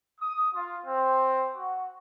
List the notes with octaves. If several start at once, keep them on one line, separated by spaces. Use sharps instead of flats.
D#6
F4
C4
F#4